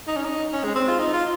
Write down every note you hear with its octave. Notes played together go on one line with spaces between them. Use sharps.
D#4
C#4
D#4
C#4
G#3
C4
F4
D#4
F4